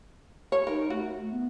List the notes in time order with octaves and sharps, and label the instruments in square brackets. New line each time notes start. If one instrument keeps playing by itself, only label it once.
[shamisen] C#5
[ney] D#4 [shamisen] A#4
[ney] A3 [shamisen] F#4
[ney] B3